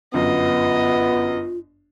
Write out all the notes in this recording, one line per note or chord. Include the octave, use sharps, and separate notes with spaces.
G1 F#2 B3 F4 D#5